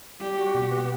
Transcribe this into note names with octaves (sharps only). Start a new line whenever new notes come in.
G3 G4
F#4
B2
B3